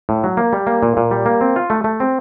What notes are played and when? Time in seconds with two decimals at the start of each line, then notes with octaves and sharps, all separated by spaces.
0.09 A2
0.24 F#3
0.37 A#3
0.53 G3
0.67 A#3
0.83 A#2
0.97 A#2
1.11 G3
1.26 A#3
1.41 C4
1.56 F4
1.70 A3
1.84 A3
2.00 C4